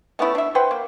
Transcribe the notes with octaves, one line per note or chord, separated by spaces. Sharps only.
A3 B3 C#4 E4
D4 E5
B4 C5 F#5 G5
A#3